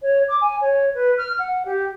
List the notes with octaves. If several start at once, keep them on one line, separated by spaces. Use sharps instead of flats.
C#5
D6
G#5
C#5
B4
F6
F#5
G4